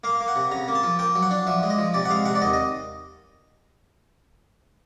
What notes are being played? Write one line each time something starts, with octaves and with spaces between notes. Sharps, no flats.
A#3 F5
A#3
F#5
C3
C#3 A#5
A#3
A5
F3
A#3 G5
F#3
F#5
D4
F3 E5
G#3
D#5
F3
C3 D5
F#5
G#3 F5
C3 F#5
D5
D#2 D#5
D#5